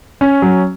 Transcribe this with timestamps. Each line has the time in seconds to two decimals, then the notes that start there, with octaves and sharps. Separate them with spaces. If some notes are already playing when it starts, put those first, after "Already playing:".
0.21 C#4
0.42 F#3